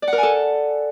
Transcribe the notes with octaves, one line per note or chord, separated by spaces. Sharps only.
D5
F#5
A#4
G#5
A4